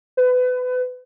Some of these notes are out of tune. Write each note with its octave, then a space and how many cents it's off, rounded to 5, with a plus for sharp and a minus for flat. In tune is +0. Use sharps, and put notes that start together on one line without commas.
B4 +25